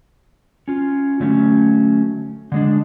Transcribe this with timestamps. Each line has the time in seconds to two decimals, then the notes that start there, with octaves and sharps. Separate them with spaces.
0.68 C#4 F4
1.20 D3 F#3 A3 C#4
2.52 D3 G#3 D4